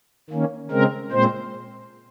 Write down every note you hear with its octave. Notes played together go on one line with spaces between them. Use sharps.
D#3 A#3 C#4
C#3 G#3 C4 A#4
A#2 G#3 C4 C5